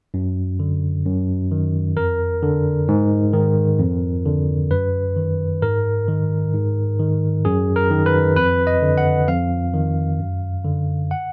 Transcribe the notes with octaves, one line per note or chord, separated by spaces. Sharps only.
F#2
D3
F#2
D#3
F2 A#4
D3
G#2
D#3
F2
D3
F#2 B4
D#3
G#2 A#4
D#3
G#2
D#3
F#2 G#4
A#4
D#3
B4
F2 B4
D#5
D3
F#5
F2 F5
D#3
F#2
D3
F#5